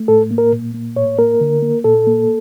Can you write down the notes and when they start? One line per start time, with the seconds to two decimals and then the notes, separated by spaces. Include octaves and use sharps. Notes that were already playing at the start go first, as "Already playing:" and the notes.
Already playing: A3
0.08 A2 A4
0.31 A#3
0.38 A#4
0.52 A#2
0.74 A#3
0.96 A2 C#5
1.19 A#3 A#4
1.41 D3
1.62 A#3
1.84 A#2 A4
2.07 A#3